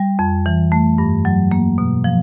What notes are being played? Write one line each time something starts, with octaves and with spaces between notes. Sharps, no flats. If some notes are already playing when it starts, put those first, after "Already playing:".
Already playing: G3
F2
E3
A3
G2
F#3
A#3
B2
F3